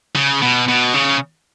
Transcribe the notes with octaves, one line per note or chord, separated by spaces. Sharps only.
C#3
B2
B2
C#3